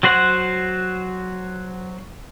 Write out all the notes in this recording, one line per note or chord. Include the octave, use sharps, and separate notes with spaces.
F#3 F#4 C5 F#5